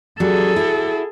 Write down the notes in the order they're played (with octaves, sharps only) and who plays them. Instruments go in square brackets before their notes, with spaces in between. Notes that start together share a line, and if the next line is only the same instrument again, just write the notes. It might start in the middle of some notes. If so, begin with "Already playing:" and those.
[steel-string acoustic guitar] F#3 G3 C#4 [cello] G#4 A4
[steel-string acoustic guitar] E4 F#4